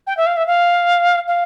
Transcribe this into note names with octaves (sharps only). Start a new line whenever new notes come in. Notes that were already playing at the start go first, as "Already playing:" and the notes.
G5
E5
F5
E5
F5
F5